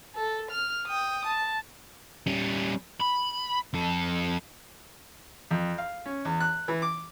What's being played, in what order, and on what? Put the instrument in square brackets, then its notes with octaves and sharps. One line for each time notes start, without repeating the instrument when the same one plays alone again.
[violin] A4
F6
G5 D#6
A5
[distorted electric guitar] G3 C#4
B5
F2 A4
[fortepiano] F2
F5
C#4
E2
F#6
E3
D6